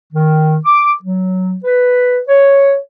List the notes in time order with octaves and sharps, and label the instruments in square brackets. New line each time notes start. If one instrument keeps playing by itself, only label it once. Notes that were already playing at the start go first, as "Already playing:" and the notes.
[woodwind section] D#3
D6
F#3
B4
C#5